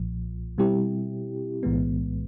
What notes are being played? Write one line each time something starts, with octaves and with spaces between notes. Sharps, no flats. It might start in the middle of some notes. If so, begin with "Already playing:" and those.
Already playing: B1 A#2 F3
B2 G3 C4 E4 G4
B1 A2 E3 G#3 B3